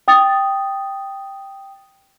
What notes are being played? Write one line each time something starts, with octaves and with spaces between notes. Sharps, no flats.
G5 D#6 A6